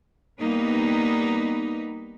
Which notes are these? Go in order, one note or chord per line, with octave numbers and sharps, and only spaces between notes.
G3 A#3 B3 D#4 B4